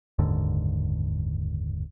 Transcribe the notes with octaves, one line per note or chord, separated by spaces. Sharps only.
F#1 D#2 G#2 D3